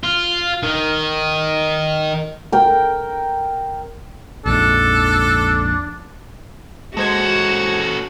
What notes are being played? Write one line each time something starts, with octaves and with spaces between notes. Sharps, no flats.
F4
D#3
A#4 G5
A#1 F2 G#2 D4 A4
G#3 C#4 F#4 A4 C5 G#6